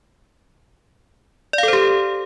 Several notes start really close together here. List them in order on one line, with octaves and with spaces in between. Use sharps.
D5 F5 A4 C5 G4